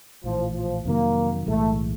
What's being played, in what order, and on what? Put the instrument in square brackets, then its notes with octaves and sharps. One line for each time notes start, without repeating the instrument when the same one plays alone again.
[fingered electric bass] A#1 A2 E3 [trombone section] F3
[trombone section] F3
[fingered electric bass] F2 C3 D#3 F#3 [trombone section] A#3
[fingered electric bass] B1 A2 E3 G#3 [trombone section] A3